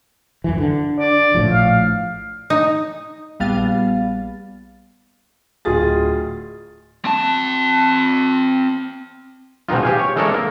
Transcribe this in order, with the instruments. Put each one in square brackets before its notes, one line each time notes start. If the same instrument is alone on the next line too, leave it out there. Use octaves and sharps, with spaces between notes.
[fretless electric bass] F#2 E3
D3
[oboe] D5
[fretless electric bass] A#1 A2 F3
[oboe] F5
[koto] D#4
[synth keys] A#1 G3 B3 F5 A6
[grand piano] D1 F4 G#4 A6
[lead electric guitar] C4 A5
[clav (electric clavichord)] G#2 B2 D#3 D#4 F4
G4 F5 G#5
C#5
E3 G#3 A4 A#4 C#5 D5
A#3